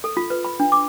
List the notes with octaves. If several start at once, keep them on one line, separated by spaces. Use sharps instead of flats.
A4
F4
B4
B5
D4
D6